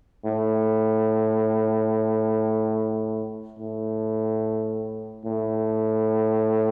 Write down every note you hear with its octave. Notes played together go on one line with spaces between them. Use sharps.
A2
A2
A2